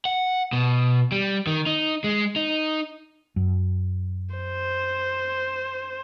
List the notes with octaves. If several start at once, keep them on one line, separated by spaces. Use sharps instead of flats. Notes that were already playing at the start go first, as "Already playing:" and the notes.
F#5
B2
G3
D#3
D#4
G#3
D#4
F#2
C5